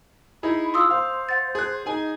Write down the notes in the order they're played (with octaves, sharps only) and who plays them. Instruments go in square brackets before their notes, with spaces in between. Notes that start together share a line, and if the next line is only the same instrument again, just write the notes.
[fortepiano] D#4 E4 G#4 [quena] B5
[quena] F4 [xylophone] C6 D#6 E6
[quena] C5 [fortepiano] F5
[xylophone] F#5 A6
[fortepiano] G#4 F#6
[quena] D#4 [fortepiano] G#4 G#5